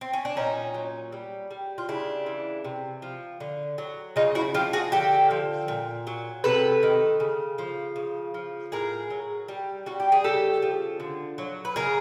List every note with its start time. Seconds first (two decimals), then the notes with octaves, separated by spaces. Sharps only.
0.01 C4
0.13 C#4
0.25 D4
0.36 A#2 C#4 D#4
0.74 F#3
1.12 G3
1.51 G3
1.78 F4
1.89 C#3 D4 E4
2.26 E3
2.64 C3
3.02 F3
3.40 D3
3.78 F#3
4.16 C#3 D#4 F4
4.35 E4 F#4
4.54 F3 F4 G4
4.73 F#4 G#4
4.92 D3 G4 A4
5.31 F3
5.68 A#2
6.07 F#3
6.44 C3 A4 B4
6.83 D#3
7.20 C#3
7.58 F3
7.96 C#3
8.34 F3
8.72 A2 G#4 A#4
9.10 F#3
9.48 G3
9.86 G3 F#4
10.00 G4
10.12 G#4
10.24 C#3 G4 A4
10.62 F3
11.00 D3
11.38 F#3
11.65 B4
11.76 C#3 G#4 A#4